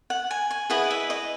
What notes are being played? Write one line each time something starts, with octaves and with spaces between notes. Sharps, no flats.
F#5
G#5
G#5
E4 G#4 B4 D#5 F#5
E5
D#5